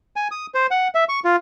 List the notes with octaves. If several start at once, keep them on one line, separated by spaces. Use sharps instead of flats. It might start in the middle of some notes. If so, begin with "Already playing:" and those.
G#5
D#6
C5
F#5
E5
C#6
F4